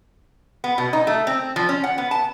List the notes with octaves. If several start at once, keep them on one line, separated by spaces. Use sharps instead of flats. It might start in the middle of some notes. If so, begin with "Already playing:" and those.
B3
B2
D#4
A3
C4
F3
C#4
F#5
B3
A5